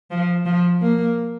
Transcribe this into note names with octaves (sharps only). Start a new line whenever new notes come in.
F3
F3
A#3